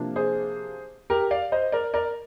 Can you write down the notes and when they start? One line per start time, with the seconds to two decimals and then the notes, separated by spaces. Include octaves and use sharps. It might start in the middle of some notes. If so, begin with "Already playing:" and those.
Already playing: C3 F3 A#3 D4 F4
0.16 G#4 C5
1.10 G4 A#4
1.31 D5 F5
1.52 C5 D#5
1.72 A#4 D5
1.94 A#4 D5